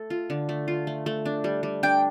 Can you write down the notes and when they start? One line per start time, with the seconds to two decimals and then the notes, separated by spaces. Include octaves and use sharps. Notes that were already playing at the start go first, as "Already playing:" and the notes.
Already playing: A3 A4
0.10 F4
0.30 D3
0.49 A3
0.68 F4
0.87 A3
1.06 A3
1.26 D4
1.44 G3
1.63 G3
1.83 D4 G5